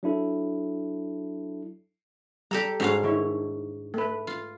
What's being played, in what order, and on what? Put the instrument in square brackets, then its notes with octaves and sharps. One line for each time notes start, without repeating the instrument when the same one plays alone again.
[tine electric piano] F#3 D4 E4 A4
[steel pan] G3 [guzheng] G4 A4 A#5
[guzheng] G#2 D4 F5 [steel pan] G#3 C#4 F#4
[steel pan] D#3 E4 C#5
A3 B4
[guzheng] F4